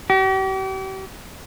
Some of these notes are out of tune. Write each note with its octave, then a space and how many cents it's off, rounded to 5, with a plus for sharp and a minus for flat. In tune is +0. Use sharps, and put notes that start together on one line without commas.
G4 -40